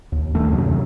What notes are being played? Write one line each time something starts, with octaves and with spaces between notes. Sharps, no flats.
D#2
D#2 D#3 A3 D4
F#2 C3 D#3 F#3